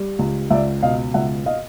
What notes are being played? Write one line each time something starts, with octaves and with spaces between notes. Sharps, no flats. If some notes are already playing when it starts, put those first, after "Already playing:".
Already playing: G3
C#2
C#2 D5 E5
B2 D#5 F5
C#2 E5 F#5
D#5 F5